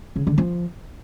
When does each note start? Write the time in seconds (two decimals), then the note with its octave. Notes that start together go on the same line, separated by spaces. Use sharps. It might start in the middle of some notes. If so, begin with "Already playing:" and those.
0.16 C#3
0.27 D3
0.38 F3